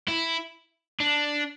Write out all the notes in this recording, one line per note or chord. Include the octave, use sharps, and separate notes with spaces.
E4
D4